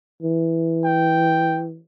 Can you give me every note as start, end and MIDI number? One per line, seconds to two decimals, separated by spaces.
0.23 1.79 52
0.84 1.64 79